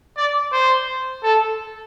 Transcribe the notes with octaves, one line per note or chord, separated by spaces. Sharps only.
D5
C5
A4